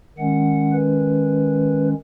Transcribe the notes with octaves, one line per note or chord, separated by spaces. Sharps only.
D#3 G#3 C#4 F#5
B4